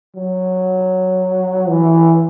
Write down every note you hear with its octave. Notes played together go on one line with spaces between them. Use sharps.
F#3
E3